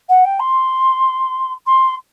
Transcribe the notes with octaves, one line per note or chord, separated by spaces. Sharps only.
F#5
G5
C6
C6